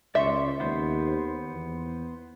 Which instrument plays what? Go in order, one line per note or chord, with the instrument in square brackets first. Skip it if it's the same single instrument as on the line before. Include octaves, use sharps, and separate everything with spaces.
[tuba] C#2 [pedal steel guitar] D5 C6 C#6 [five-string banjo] E5
[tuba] D#2 [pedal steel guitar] B3 C5
[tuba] E2